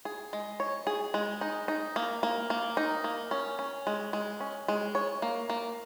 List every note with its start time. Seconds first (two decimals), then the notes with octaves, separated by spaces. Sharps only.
0.05 G#4
0.33 G#3
0.60 C#5
0.87 G#4
1.14 G#3
1.41 D#4
1.68 D#4
1.96 A#3
2.23 A#3
2.50 A#3
2.77 D#4
3.04 A#3
3.31 C#4
3.59 C#4
3.87 G#3
4.13 G#3
4.40 C#4
4.68 G#3
4.95 C#5
5.22 A#3
5.50 A#3